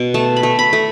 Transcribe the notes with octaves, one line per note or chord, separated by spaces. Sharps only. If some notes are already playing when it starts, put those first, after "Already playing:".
Already playing: B2
A3 A5
B5
A3
B5
A3